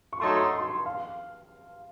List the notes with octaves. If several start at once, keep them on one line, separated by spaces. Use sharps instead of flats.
C#6
F#3 A3 D#4 A4 C#5 C6
C6
C6
C6
F5